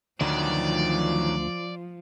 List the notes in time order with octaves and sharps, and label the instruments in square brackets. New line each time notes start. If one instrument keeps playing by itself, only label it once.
[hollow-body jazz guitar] D2 [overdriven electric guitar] D#3 F#3 [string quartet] F3 [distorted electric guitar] D5